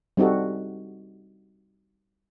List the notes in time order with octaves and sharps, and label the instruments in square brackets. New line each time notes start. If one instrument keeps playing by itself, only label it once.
[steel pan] G3 C4 D#4 F#4 A4